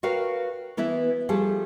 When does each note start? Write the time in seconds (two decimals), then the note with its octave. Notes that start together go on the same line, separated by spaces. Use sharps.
0.03 F#4 A#4 B4 C#5 F5 G5
0.77 E3 B3 E4 B4 E5
1.29 F3 G3 A3 G#4 A4